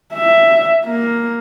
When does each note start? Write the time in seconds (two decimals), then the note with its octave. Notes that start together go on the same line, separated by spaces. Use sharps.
0.14 E5
0.84 A#3